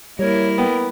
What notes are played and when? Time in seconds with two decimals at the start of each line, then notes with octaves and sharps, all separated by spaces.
0.19 G3 A#3 E4 A#4 C#5
0.58 B3 G5